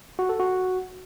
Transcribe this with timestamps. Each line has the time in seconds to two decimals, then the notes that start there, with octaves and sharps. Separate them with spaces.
0.19 F#4
0.29 A4
0.40 F#4